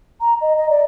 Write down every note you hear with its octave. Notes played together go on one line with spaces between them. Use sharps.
A#5
D#5
D#5
D5